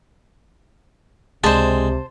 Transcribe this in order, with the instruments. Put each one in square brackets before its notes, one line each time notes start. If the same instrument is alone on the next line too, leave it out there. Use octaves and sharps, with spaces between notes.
[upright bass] C#2 [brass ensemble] C3 [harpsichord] G#3 D4 [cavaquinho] C5 A5